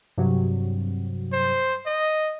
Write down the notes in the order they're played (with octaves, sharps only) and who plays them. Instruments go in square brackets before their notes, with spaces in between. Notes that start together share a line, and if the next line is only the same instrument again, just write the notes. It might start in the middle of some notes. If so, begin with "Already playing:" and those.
[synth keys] G2 C3 F#3
[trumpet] C5
D#5